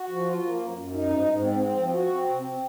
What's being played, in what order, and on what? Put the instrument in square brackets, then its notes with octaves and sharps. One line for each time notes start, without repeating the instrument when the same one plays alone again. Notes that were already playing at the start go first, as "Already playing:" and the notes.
Already playing: [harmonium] F#4
F3
F4
A#3
F#2
F#2
D#4
G#2
G#2
C4
C4
F3
F#4
C4
C3
C4